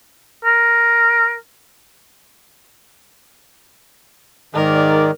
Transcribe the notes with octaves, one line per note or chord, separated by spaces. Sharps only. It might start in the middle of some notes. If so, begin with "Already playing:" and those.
A#4
G#2 D#3 A#4 D5